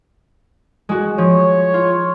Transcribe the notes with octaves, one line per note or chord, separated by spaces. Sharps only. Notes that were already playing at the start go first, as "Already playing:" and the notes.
G#3 F#4
F3 C#5
F4